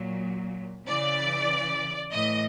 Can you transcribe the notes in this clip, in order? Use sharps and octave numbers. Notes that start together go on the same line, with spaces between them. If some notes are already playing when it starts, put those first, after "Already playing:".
Already playing: A#2 F#3
C#3 E3 D5
A2 E3 D#5